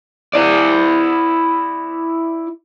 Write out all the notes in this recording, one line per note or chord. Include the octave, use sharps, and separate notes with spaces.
E4 D5